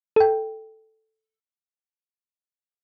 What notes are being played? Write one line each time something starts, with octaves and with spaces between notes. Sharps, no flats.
A4 G5